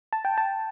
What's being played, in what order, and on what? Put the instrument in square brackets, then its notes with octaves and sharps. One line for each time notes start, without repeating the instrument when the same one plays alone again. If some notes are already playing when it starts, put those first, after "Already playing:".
[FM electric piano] A5
G5
A5